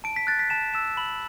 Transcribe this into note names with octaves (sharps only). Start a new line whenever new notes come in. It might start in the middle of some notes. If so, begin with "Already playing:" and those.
A5 D7
B6
F#6 A6
B6
A5 E7
E6 E7
B5 F#7